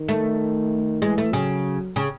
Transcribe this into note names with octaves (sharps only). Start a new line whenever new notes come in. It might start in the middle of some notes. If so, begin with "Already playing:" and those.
Already playing: D#3
A3
E3 G#3
A3
C#3 F#3
C#3